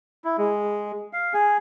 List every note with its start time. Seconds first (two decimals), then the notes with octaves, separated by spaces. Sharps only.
0.24 E4
0.38 G#3
1.13 F5
1.34 G#4